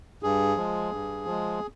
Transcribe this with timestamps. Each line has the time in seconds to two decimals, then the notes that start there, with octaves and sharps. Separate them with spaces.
0.23 G2 G#4
0.56 F3 G#3
0.91 G2
1.25 F3 G#3